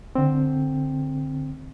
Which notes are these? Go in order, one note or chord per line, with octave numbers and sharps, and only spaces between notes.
D3 C4